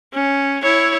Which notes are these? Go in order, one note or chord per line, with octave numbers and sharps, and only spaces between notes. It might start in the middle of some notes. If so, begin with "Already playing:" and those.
C#4
E4 C#5